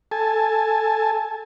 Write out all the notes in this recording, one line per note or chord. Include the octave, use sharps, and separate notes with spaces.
A4 G#5 A5